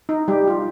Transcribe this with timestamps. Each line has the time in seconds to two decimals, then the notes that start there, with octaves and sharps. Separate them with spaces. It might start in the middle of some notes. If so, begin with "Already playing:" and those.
0.09 D#4
0.28 G3 G4
0.47 F4